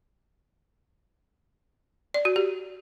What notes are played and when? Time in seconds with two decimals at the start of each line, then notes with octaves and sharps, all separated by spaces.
2.14 D5
2.25 F#4
2.36 G4